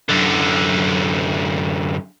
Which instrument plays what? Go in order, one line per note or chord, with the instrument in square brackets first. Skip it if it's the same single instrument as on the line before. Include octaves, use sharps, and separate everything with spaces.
[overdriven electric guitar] F#2 D3